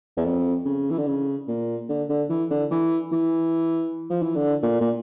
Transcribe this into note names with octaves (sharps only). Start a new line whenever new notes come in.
E2
F2
C#3
E3
D3
C#3
A#2
D3
D3
E3
D3
E3
E3
F3
E3
D3
A#2
A#2